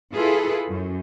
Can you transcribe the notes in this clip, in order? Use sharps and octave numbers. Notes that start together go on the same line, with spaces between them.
E4 F4 G#4 A4 B4
F#2